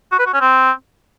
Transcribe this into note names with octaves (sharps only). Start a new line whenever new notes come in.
F#4
B4
F#4
C#4
C4